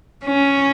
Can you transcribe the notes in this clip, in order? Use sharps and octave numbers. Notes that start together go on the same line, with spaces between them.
C#4